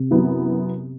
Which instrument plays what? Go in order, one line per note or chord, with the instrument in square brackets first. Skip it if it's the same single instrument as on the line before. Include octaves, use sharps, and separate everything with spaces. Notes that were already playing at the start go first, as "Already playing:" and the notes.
Already playing: [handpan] C3
[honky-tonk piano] F#2 E3 B3